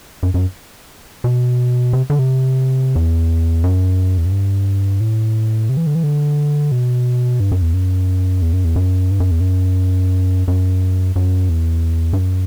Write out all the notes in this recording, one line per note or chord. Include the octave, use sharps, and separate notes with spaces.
F#2
F#2
B2
C3
D3
C3
E2
F#2
E2
F#2
G2
A2
C3
E3
D3
E3
D3
B2
G2
F#2
E2
F#2
E2
F#2
E2
F#2
G2
F#2
E2
F#2
F#2
F#2
E2
G2
F#2